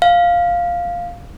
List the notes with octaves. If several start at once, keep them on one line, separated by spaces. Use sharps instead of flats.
F5